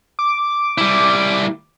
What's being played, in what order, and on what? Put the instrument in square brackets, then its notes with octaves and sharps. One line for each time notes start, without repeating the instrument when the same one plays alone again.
[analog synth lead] D6
[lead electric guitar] G3 E4